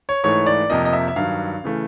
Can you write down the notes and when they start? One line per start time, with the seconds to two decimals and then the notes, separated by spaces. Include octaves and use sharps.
0.09 C#5
0.24 G#2 E3 A3 C#5
0.46 D5
0.70 F2 C3 F3 A#3 D#5
0.85 D#5
0.93 E5
1.08 E5
1.16 G2 D#3 F#3 F5
1.64 C#3 E3 A3